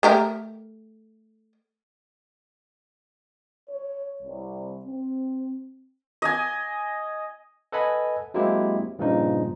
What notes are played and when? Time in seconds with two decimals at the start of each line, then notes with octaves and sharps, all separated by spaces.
0.03 A3 G4 A#4
3.70 C#5
4.23 C2
4.86 C4
6.22 D#5 G#5
7.72 A4 B4 D#5 F#5 G#5 B5
8.34 F#3 G#3 A#3 C4 E4 G4
8.99 G2 A#2 C#3 F3 D#4